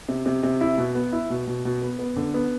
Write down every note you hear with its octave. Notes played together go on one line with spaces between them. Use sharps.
C3
C3
C3
E4
B2
B3
E4
B2
B2
B2
B3
B3
D3
B3